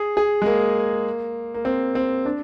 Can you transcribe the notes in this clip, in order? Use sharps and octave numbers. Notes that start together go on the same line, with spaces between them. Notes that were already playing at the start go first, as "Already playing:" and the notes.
Already playing: G#4
G#4
G#3
A#3
A#3
C4
C4
D4